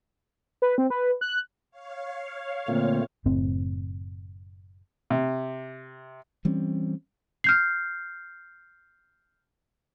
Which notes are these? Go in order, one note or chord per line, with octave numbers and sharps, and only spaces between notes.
B4
C4
B4
F#6
C#5 F5
A#2 D3 A3 A#3 C4
F#1 A2 C4
C3
E3 G3 C4 C#4
F6 G6 C7